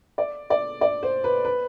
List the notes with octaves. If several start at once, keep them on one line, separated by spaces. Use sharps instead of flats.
D5
D5
D5
C5
B4
B4